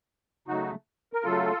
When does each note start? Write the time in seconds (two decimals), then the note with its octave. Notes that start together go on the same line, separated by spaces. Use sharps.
0.48 C#3 F#3 A3 D#4 F#4
1.13 A#4
1.24 C#3 F#3 A3 F4 A4